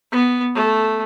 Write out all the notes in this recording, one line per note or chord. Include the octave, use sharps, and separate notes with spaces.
B3
A3